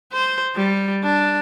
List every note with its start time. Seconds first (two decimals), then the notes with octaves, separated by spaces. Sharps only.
0.13 C5
0.56 G3
1.04 D4